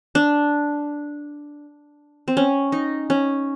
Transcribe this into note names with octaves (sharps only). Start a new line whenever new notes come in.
D4
C4
C#4
D#4
C#4